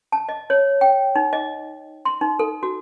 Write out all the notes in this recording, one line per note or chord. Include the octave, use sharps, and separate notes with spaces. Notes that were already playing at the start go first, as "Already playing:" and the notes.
A5
D#5
C#5
G5
D#4
D#5
C6
D#4
A4
F#4